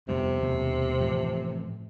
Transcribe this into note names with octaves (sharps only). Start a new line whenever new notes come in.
F2 C3 G3 B3
D#2 B2 A3
A2 E3 F3